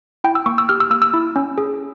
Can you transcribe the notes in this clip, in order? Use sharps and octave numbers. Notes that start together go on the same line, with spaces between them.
E4 G5
E6
A#3 C#6
E6
G4 F6
E6
A#3 E6
E6
E4
C#4
G#4